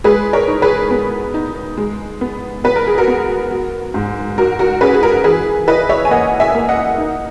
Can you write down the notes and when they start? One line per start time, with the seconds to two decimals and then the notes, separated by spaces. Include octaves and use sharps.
0.04 G#3 G#4 B4
0.33 A#4 C#5
0.48 D#4
0.62 G#4 B4
0.91 B3
1.34 D#4
1.77 G#3
2.21 B3
2.64 B3 B4
2.76 A#4
2.87 G#4
2.98 F#4 A#4
3.08 B3
3.51 F#3
3.94 G#2
4.38 F#3 F#4 A#4
4.59 F#4 A#4
4.81 C#4 G#4 B4
4.94 G#4
5.02 F#4 A#4
5.24 E3 G#4 B4
5.68 E4 B4 D#5
5.80 D#5
5.89 C#5 E5
6.05 G#5
6.11 A#3 D#5 F#5
6.40 E5 G#5
6.55 A#3
6.68 D#5 F#5
6.98 D#4